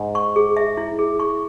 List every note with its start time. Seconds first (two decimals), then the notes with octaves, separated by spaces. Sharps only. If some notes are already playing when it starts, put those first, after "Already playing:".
Already playing: G#2
0.15 C#6
0.36 G#4
0.57 E5
0.77 E4
0.99 G#4
1.19 C#6